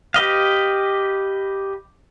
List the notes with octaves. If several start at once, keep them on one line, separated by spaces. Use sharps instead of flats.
G4 B4 D#5 F5